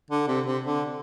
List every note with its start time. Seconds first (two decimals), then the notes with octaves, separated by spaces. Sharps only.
0.10 D3
0.28 C3
0.46 C3
0.64 D3